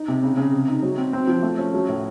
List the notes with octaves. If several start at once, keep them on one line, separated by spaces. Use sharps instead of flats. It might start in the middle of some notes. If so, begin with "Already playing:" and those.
Already playing: D#4
C3
C#3
C#3
C3
D#4
F#3
C4
C4
F3
A3
C#4
F#3
A2